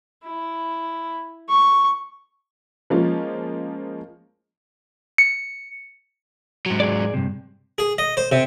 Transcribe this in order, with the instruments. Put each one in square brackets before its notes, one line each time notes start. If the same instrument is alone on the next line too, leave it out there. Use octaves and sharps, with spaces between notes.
[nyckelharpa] E4
C#6
[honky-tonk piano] F3 G#3 A#3 C#4 F4
[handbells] C#7
[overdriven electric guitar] G#2 F#3
[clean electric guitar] G#4 D5
G2 C3
[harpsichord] G#4
D#5
C5
C3